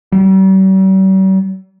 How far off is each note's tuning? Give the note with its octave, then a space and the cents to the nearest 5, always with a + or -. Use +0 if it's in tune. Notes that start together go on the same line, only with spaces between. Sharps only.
G3 -45